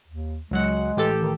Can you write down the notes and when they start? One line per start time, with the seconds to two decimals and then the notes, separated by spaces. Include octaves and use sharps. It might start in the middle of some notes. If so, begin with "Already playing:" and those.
0.07 D#2
0.51 C#2 F#3 G#3 F#5
0.97 A1 G4 A4
1.22 D#3